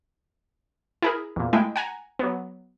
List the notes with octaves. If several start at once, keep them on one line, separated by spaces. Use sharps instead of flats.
E4 G#4 A#4
E2 A#2
G#3 A3 E4 G5
F#5 G#5 A#5
F#3 B3